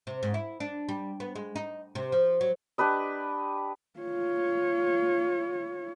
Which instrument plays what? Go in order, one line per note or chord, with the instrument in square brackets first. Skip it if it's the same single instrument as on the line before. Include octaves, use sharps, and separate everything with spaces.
[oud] C3
G#2
E4
D4
G3
B3
G#3
D#4
C3
F3
F#3
[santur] D4 G4 B4 D#5
[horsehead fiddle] F4 C#5